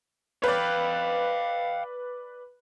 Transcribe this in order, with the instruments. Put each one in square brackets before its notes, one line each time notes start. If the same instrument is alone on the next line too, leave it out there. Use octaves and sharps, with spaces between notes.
[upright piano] B4 D5 [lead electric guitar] F5 G5